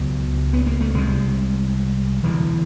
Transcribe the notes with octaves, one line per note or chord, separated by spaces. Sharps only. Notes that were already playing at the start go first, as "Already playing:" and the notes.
Already playing: C#2 B2 F#3
B3
A#3
A3
C2 C3 G#3
E1 D2 D3 E3